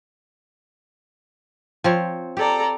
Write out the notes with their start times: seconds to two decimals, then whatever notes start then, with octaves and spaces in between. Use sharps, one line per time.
1.84 F3 C4 C#5
2.37 G4 A4 D5 A#5